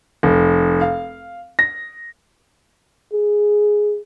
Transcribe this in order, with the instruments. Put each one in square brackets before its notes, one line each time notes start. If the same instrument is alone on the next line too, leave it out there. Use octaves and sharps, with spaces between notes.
[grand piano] F1
F5
A#6
[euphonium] G#4